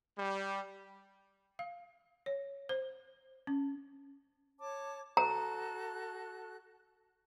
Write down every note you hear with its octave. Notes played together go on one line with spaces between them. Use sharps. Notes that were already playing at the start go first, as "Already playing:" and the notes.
G3
F5
C#5
C5
C#4
C#5 A5 D6
F#4 A4 A#5 F#6